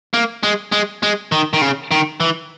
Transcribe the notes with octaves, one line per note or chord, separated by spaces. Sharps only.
A#3
G#3
G#3
G#3
D#3
D#3
C#3
D#3
E3